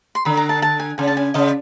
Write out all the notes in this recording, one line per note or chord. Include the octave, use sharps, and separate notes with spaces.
C6
D3 B5
A#5
A5
A5
G#5
C#3 G#5
A5
G#5
C#3 D#5